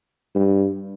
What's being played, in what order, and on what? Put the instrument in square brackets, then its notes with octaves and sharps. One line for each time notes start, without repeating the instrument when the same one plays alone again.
[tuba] G2